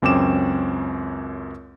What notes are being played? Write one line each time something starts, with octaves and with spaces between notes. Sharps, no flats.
C#2 F#2 C4 C#4 D6 E7